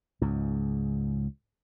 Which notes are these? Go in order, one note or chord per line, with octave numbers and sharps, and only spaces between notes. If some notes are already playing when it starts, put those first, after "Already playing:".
C#2 G#2